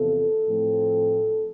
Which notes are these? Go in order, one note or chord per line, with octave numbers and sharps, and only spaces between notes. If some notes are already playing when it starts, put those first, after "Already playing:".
Already playing: E2 C3 F3 A4
A2 F3 C4